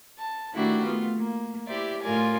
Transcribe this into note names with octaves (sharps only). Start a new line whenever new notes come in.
A5
D#3 A3 D4 E4 F#4 G4
A3 B3 F4
A#3
E4 G4 C5 D5 E5
A2 F4 A#4 D5 G#5